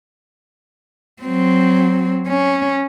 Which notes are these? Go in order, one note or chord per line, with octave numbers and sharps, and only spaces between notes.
F#3 C4
C#4